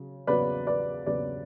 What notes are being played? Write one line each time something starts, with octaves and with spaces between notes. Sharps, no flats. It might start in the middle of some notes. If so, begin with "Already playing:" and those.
Already playing: C#3 F#3
E2 C#3 F#3 B4 D5
B4 D5
E2 C#3 F#3 B4 D5